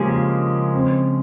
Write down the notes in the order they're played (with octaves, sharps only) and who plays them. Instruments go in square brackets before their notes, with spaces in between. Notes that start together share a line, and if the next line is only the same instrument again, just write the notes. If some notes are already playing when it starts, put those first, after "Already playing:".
Already playing: [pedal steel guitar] C#3 F3 G#3 C#4 G#4 [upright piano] A#3 G4
[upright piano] F4
C4